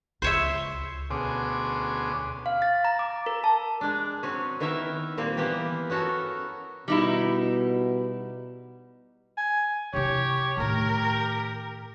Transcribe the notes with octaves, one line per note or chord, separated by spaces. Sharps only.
C#2 C5 C#5 E5
D2 B2 C#4 G#4 C6 D6
F5
A6
A#5
D6
A#4
A5
G#3 D4
F#3 C4 C#4
D#3 B3 E4 A#4 E5
A#2 G3 A#3 C4
E3 A#3 B3 G4
B3 C#4 F#4 A4 A#4
B2 G3 D#4 E4
G#5
C3 E4 G4 C#5
A2 D#3 G4 A#4